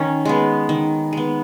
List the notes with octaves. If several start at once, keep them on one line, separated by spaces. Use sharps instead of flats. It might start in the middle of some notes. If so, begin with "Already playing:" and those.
Already playing: D#3 C#4
G#3 B3
D#3
G#3 B3